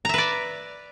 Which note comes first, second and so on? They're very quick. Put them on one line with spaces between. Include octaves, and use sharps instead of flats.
A#5 E5 B4 D5